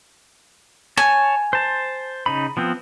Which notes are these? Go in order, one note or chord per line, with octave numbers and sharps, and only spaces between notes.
C#5 G#5 A5
C5 A5
C#3 D#4 B5
F3 B3 C4